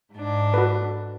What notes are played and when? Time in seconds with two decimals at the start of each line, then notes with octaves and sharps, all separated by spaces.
0.11 G#2 D4
0.54 F#4 A4 B4